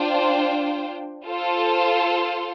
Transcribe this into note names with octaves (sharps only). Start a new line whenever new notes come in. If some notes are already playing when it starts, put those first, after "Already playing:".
Already playing: D4 F4 C5 G5
F4 A4 C5